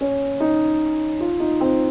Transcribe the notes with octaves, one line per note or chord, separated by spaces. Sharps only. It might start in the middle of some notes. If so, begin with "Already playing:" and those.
C#4
D#4
F4
D#4
C4